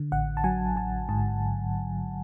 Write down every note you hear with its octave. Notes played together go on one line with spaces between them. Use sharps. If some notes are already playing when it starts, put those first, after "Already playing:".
Already playing: D3
A1 F#5
A5
F#3 G#5
A1 A5
G#2 A5